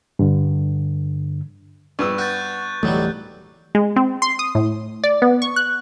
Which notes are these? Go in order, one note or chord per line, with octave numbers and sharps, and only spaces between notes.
G2 D3
A#1 G2 B3 C#6 E6
F#4 F#6 G6 A6
D1 B1 E3 F#3 G3 A3
G#3
C4
C6
D#6
A2
D5
B3
C#6
F#6